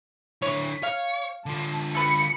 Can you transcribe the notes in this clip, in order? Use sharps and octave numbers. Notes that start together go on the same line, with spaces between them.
D3 E4 C#5
C#5 F5
D3 F4 A5
A4 B4 B5 C#7